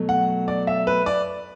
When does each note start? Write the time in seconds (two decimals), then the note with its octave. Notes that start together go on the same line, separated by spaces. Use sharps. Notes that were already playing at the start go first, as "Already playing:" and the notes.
Already playing: B2 F#3 A3
0.09 F#5
0.48 D5
0.67 E5
0.87 B4
1.06 D5